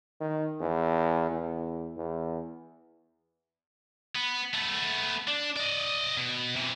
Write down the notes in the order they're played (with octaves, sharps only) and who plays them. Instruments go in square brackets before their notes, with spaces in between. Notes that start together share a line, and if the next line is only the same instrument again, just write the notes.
[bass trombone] D#3
E2
E2
E2
[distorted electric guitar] B3
A3 B3
D4
D5 D#5
B2
C3 E3